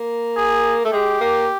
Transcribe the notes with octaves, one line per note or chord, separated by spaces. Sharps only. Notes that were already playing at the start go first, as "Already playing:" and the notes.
Already playing: A#3
G#4
A3
G#3 G4
A#3